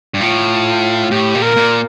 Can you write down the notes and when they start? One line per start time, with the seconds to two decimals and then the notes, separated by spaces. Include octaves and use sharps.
0.14 G2
0.20 A2 F4
1.11 A2 G4
1.35 A#2
1.42 A#4
1.57 A#2